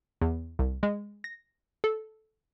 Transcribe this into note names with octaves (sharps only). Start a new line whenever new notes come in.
E2
C2
G#3
A#6
A4